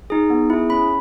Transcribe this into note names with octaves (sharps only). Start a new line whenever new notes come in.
D#4 G#4
B3
E4 G#4
C#4 B5